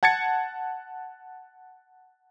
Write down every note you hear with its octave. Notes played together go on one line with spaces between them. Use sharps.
F#5 A5 G#6 A6 C#7